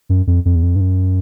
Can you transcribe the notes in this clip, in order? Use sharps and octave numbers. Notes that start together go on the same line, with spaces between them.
F#2
F2
F2
E2
F2
G2
F#2